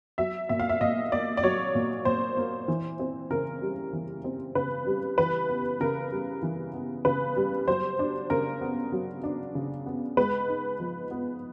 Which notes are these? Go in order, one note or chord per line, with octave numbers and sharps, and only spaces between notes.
F#3 E5
A#2 E5
F5
E5
A#2 D#5
A#3 D5
D5
F#3 C#5
A#2
A#2 C5
A#3
E3
C4
C#3 A#4
G3
E3
C4
C#3 B4
G3
E3 B4
B3
C#3 A#4
G3
E3
B3
C#3 B4
G3
F#3 C5
D4
C#3 A#4
B3
F#3
D4
C#3
B3
G#3 B4
D#4
F3
B3